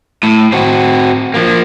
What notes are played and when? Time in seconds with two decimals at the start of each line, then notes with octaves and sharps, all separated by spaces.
0.23 A2
0.52 C4 F#4
1.34 F3 A#3